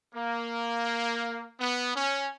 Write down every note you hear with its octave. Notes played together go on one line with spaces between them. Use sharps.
A#3
B3
C#4